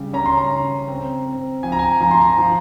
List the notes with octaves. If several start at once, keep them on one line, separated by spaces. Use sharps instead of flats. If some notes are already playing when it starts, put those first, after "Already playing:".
Already playing: C#3 G3
C#4 A#5
C6
A#5
C#3
C4
C4
F3 G#5
A#5
G#5
F3 A#5
C6
A#5
F3